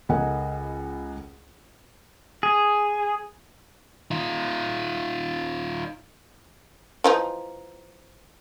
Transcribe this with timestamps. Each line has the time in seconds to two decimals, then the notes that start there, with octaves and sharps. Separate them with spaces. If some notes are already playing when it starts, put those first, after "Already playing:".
0.09 C#2 A4 A#4 D#5 F#5 G#5
2.43 G#4
4.11 D#4 F4
7.04 E3 F3 D#4